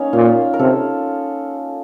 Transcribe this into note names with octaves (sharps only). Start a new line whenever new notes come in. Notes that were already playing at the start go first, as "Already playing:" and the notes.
Already playing: A#3 C#4 D#4
A#2 F4
A#4
C3 A4